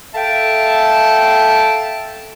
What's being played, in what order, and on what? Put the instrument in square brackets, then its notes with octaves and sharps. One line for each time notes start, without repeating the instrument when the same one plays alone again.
[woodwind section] A4 E5 F5 G5 A5